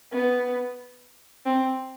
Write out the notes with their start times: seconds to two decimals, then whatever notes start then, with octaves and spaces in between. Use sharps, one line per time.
0.12 B3
1.45 C4